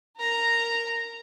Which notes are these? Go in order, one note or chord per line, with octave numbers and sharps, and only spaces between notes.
A#4 A#5